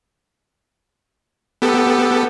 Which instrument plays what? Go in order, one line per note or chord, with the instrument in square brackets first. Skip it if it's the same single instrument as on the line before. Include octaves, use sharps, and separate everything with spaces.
[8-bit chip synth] B3 G4 A4